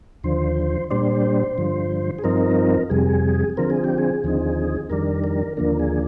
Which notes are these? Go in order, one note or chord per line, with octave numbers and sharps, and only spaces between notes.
D#2 D3 F3 C5
A#2 G3 D4 C5
G2 D3 F3
G#4
G2 F3 C4 D#4 A#4
F2 C3 G3 G#4
D3 F3 C4 A#4
G#4
G4
G#4
D#2 D3 F3 C4 D#4
F2 D#3 G3 D4 A#4
A#4
D#2 D3 F3 A#3 D4 A#4
G#4